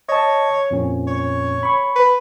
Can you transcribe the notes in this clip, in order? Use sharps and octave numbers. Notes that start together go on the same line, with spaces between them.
C#5 D#5 A5
F2 A#2 C#4
C#5
B5 C#6
B4